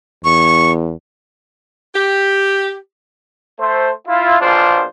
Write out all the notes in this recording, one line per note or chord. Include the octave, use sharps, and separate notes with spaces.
E2 C#6
G4
A3 C5
E4 F4
A#1 B2 D4 F4 C5